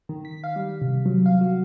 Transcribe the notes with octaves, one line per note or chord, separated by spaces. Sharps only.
D#3
B6
F5
G3
C3
F#3
F5
F#4